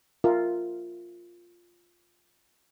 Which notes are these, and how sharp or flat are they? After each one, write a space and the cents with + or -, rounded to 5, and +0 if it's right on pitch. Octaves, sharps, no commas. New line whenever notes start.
F4 +0 A#4 -10 E5 +0